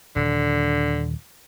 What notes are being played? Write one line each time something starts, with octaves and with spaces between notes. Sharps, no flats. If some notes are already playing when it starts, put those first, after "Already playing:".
D#1 D3